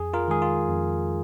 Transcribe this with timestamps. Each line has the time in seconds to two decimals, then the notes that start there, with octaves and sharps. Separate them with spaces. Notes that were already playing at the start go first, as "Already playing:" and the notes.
Already playing: F2 G#4
0.14 F4 A#4
0.28 D#3 G#3 G#4
0.42 F4
0.69 F2